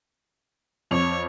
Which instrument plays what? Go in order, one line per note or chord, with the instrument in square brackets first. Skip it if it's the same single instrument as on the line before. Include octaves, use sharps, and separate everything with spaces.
[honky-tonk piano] F2 D6 F7 [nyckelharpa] C#5